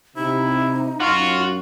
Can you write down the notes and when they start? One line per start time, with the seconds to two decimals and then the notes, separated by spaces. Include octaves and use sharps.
0.17 C3 D#4 E4
1.01 F#2 F4 F#4